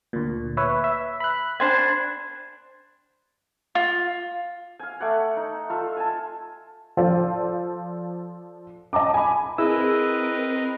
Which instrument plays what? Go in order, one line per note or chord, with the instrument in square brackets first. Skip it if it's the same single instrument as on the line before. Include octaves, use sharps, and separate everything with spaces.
[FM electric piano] D2 A#2
B4 C#5 E5
E5
B5 F#6
[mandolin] D4 C5 G#5
[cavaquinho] F4
[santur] F5 G#5
A3 D5 F#5
D#4
F4 A4 E5
G#5 A5
[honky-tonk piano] F3 F4 A4 C5 D5
D#5 A5 A#5 D6
G#5 B5
[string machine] C4 A#4 [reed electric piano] E4 E6 [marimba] G#4 [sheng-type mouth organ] B4 D#5